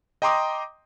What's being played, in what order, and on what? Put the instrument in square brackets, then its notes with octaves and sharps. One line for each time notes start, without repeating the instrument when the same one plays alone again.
[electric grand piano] D#5 G5 A#5 C6 D6 D#6